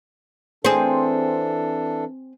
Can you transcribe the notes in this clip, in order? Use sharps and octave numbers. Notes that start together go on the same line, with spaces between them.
E3 C4 D4 G#4 A4